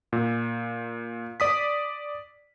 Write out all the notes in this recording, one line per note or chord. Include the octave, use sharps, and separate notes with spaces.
A#2
D5 D#6 B6